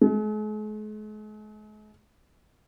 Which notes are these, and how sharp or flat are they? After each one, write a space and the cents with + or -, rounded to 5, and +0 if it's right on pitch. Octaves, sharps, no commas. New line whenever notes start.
G#3 +45